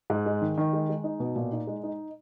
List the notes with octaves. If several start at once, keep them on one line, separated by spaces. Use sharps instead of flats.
G#2
G#3
D#3
D#3
G#3
G#3
D#4
B2
A#2
D#4
G#3
D#4